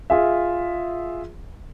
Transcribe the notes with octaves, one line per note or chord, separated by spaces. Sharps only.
F4 G#4 E5